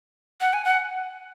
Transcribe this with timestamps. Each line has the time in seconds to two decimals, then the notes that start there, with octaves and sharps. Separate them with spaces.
0.41 F#5
0.53 G#5
0.65 F#5